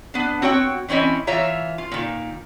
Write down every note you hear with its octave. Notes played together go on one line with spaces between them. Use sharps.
B3 D4
C4 F#4 C#5 G5
E3 C4 C#4 E4 D#5
E3 F4 C#5 E5 A#5
F4
A#2 D#3